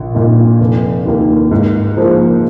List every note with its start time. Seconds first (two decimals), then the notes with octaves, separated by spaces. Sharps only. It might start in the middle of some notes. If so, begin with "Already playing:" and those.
Already playing: A#1
0.15 A#2 A#3 D#4
0.60 F1
1.06 D#2 D#3 A#3
1.51 G#2
1.97 F3 A#3 G#4 C5